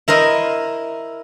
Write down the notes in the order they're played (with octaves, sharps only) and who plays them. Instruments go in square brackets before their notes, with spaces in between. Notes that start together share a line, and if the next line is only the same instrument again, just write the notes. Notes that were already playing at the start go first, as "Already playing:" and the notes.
[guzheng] E4 A#4 C5 D#5